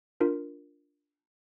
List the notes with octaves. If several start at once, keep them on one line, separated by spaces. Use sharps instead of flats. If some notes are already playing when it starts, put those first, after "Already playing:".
D4 F4 A#4